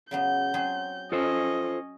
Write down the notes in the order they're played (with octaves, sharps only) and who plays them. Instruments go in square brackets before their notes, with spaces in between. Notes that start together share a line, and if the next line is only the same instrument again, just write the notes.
[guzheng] C#3 F#3 B3 [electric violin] G6
[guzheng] F#3 C4 G#4
[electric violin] C#4 D#5 [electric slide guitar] F4 A4 C5